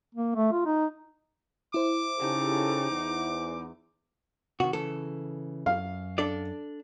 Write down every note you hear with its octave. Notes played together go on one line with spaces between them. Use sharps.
A#3
A3
F4
D#4
E4 C5 D6
C#3 D#4 G4 A4
E2
C3 D#3 F#4
C#3 E3 A4
F#2 F5
D4 A4 D5